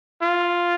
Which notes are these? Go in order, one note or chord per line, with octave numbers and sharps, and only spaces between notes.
F4